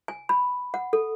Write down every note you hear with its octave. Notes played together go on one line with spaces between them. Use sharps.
G#5
B5
F#5
A4